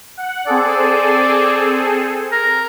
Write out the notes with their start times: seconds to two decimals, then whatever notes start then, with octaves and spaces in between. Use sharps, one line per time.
0.17 F#5
0.47 C4 G#4 A4 D5
2.32 A#4